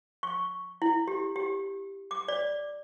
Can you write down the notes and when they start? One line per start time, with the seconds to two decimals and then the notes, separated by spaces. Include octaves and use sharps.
0.23 C#6
0.82 E4
1.08 G4
1.36 G4
2.11 D6
2.28 D5